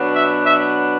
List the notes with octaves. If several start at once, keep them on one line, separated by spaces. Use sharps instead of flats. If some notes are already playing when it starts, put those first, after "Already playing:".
Already playing: B2 F#3 B3 D4
E5
E5